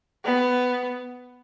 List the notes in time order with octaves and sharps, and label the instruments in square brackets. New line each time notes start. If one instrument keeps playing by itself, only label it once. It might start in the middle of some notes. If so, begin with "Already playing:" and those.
[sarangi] B3